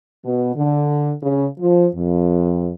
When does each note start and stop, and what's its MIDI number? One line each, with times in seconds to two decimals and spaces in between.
0.24 0.54 47
0.56 1.12 50
1.22 1.45 49
1.59 1.87 53
1.95 2.72 41